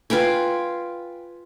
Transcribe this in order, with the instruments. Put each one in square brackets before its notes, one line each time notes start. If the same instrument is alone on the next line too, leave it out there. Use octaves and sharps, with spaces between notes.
[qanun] F4 B4 G5 G#5